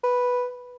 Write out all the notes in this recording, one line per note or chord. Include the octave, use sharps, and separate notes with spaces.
B4